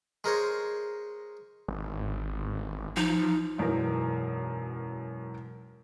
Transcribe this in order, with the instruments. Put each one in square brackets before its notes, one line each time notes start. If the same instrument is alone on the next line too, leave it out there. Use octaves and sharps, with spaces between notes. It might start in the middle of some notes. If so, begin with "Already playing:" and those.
[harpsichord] G#3 A#4 C5 C#5
[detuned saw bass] G#1
[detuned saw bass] F3 [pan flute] D#4
[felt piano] E1 F#2 E3 D#4 A#4